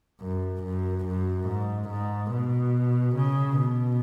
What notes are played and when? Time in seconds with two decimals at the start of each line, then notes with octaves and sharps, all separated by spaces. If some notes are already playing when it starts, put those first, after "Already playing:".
0.21 F#2
0.63 F#2
1.06 F#2
1.48 G#2
1.90 G#2
2.32 B2
3.16 C#3
3.59 B2